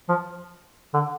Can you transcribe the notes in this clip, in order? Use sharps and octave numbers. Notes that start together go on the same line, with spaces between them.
F3
D3